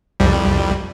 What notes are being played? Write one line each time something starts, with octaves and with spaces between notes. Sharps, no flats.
C2 F2 G3